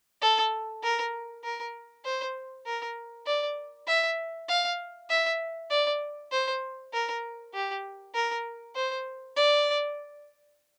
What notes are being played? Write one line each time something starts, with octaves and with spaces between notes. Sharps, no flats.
A4
A#4
A#4
C5
A#4
D5
E5
F5
E5
D5
C5
A#4
G4
A#4
C5
D5